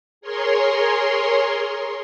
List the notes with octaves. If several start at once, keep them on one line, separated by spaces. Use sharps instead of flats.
G#4 A#4 C#5 C6